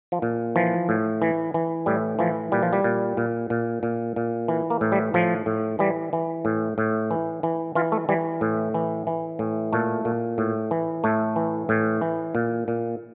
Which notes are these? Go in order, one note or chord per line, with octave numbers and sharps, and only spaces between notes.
F3
A#2
E3 F3
A2
E3
E3
A2 G3
E3 F3
A#2 G3
F3
G3
A#2
A#2
A#2
A#2
A#2
E3
A#3
A2
G3
A2 F3
A2
E3 G3
E3
A2
A2
E3
E3
E3 F4
A3
E3 G3
A2
E3
E3
A2
A#2 A3
A#2
A2
E3
A2 A3
E3
A2
E3
A#2
A#2